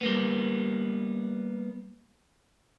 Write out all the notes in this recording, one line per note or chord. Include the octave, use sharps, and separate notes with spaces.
G3 A#3 B3